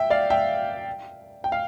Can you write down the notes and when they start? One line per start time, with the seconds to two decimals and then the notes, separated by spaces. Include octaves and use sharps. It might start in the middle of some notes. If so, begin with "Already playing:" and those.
Already playing: E5 G5
0.10 D5 F5
0.30 E5 G5
1.44 G5
1.52 F5